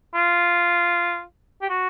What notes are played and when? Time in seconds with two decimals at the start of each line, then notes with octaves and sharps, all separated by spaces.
0.15 F4
1.62 G4
1.70 F#4